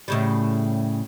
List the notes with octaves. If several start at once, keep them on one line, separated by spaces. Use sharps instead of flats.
A2 C#3 G3